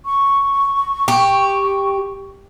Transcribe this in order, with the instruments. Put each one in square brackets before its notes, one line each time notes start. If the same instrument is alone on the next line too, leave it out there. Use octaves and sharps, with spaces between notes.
[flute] C#6
[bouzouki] G4